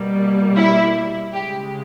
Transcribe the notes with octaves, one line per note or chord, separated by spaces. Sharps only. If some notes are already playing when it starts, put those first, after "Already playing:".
Already playing: B2 G3 A#3
E4
C#3 G#3 G4